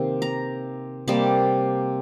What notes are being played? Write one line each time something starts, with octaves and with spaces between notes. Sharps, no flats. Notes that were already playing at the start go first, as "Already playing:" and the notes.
Already playing: C3 D#3 A#3
A#5
C3 G3 A#3 A5